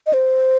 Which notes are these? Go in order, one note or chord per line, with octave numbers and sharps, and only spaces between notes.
D#5
C5